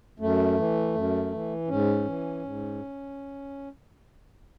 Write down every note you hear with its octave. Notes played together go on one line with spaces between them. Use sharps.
F#2 A3
E3
F#2
E3
G#2 C#4
E3
G#2